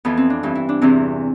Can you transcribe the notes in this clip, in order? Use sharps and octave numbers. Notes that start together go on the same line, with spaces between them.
F2 E3 B3
C4
D4
G2 E3
E4
D4
E2 C3 E3 C4